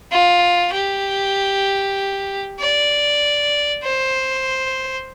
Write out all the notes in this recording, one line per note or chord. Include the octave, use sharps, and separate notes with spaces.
F4
G4
D5
C5